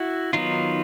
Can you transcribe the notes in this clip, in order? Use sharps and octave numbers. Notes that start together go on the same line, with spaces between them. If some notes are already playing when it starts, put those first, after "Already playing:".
Already playing: E4 F#4
D#3 F#3 B3 D#4 F4